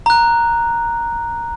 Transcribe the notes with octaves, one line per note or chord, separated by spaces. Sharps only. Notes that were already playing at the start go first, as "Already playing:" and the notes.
A#5 F#6